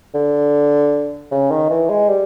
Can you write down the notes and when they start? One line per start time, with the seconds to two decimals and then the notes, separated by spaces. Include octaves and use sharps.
0.15 D3
1.31 C#3
1.51 D#3
1.70 E3
1.90 G#3
2.09 G3